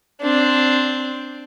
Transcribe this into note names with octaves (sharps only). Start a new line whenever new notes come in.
C4 D4